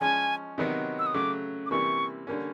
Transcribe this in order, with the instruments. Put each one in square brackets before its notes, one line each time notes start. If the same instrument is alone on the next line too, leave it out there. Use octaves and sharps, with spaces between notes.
[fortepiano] F3 G#3 C#4 [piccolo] G#5
[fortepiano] C3 D#3 F#3 B3 D#4
[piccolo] E6
D#6
[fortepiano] C#3 F#3 A3 [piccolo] D6
[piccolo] D6
[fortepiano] C3 E3 G3 A#3 [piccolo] C#6
[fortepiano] D3 G3 A#3 C#4